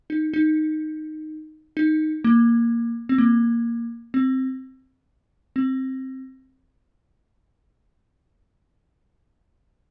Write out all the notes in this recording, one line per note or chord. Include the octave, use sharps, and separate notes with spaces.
D#4
D#4
D#4
A#3
C4
A#3
C4
C4